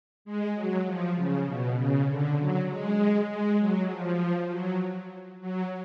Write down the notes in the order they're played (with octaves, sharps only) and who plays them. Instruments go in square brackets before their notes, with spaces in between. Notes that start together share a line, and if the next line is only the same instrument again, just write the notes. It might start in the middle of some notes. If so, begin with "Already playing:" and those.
[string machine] G#3
F#3
F3
C#3
B2
C#3
D3
F#3
G#3
G#3
F#3
F3
F#3
F#3